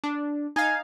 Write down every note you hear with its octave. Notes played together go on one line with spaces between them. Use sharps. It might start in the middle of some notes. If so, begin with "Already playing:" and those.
D4
D#4 F5 G#5